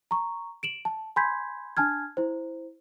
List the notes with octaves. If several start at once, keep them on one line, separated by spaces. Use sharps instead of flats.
A#5 C#6
D7 E7 F#7
A5
G#5 B5 C6 G6 G#6 B6
D4 G#5 A5 F6 G#6
E4 C5